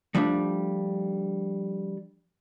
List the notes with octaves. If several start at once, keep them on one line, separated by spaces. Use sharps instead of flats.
F3 G3 A3 D4